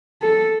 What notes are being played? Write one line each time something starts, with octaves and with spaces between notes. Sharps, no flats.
A4